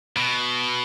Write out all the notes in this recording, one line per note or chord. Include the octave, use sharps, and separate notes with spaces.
B2